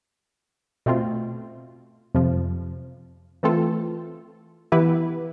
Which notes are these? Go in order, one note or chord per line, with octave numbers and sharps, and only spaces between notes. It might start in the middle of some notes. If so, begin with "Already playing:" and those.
B2 A3 C4 F4
F2 C3 F3
E3 A3 C4 F4 A4
E3 B3 E4 G4 B4